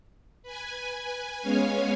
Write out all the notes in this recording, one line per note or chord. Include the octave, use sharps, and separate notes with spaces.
B4 G#5
G#3 B3 C#4 C#5 F5 G#5